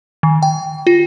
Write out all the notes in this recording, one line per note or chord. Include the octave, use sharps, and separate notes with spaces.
D#3
G5
F4